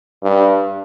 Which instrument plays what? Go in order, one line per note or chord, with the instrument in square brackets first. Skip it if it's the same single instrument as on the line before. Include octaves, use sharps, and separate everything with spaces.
[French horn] G2